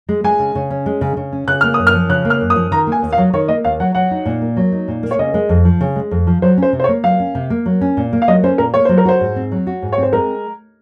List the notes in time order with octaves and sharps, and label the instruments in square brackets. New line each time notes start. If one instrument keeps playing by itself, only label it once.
[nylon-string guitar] G#3
[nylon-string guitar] G#3 [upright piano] G#5
[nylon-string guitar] C#3
C#3
C#4
G#3
C#3
C#3
C#4
[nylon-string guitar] C#3 [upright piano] F#6
[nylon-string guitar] A#3 [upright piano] F6
[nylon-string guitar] F#2 [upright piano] D#6
[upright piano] F6
[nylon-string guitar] F3
[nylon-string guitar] C#3 [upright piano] F#6
[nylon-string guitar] A#3
[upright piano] F6
[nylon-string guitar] F#2
[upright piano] D#6
[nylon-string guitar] F3
[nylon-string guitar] D#3 [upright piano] A#5
[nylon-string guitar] A#3 [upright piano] G#5
[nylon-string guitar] D#2
[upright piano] F5
[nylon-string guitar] F#3
[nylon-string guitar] D#3 [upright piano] C#5
[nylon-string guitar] A#3 [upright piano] D#5
[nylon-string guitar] D#2 [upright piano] F5
[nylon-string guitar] F#3 [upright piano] F#5
[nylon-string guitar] F#3 [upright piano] F#5
[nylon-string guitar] D#4
A#2
A#3
F#3
D#4
A#2
A#3
[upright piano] C#5
[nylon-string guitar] C#3 [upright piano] D#5
[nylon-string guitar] G#3
F2
F3
C#3
G#3
F2
F3
[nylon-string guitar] F#3 [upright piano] C5
[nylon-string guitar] C#4
[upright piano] C5
[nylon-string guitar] C3
[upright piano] C5
C#5
[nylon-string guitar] A#3
[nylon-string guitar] F#3 [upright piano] F5
[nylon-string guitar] C#4
C3
A#3
F#3
C#4
A#2
A#3
[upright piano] F5
[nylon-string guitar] F#3 [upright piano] D#5
[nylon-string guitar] C#4 [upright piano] C5
[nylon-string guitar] A#2 [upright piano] A#4
[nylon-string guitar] A#3 [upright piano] C#5
[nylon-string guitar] F#3 [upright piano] C5
[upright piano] A#4
[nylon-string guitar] F#4 [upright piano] C5
[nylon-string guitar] G#2
C4
F#3
F#4
G#2
[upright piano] C#5
[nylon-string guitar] C4 [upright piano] C5
[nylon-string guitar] G#3 [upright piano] A#4